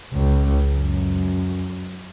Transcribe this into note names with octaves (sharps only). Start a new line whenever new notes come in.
C#2
F#2